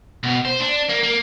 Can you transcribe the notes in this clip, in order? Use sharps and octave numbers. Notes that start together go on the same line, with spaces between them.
B2
C5
D4
A#3
A#3